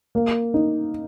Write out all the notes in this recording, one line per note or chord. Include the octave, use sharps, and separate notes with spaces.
A#3
D#4